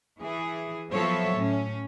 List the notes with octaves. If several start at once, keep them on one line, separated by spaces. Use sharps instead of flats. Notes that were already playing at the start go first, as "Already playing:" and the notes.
E3 G#4
F3 F#3 B3 A4 C#5 E5
A2 C#4